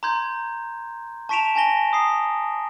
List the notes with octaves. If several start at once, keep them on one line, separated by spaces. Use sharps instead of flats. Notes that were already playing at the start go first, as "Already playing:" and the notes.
A#5 C6 G6 G#6
A5 C#6 B6 D7 E7 F7
G#5 A5 A#6 G7
A#5 D#6 C7